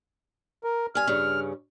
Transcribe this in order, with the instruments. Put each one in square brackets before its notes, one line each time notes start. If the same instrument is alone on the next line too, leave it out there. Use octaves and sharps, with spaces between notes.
[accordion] A#4
[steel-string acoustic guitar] G2 G#5 [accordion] F6
[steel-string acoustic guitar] G2 C#3 C#4